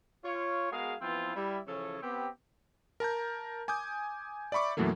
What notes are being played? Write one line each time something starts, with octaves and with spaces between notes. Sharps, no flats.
F4 C#5
G#3 B3 F#4 G#4 A#4 F5
E3 F3 B3 C4 E4 F4
G3 E4
C#3 E3 F3 A4 C#5
B3 C4 G4
A#4 A5 A#5 G6
G#5 D6 D#6 G6
D5 E5 B5 C#6 D6
F#2 B2 E3 F#3 A3 A#3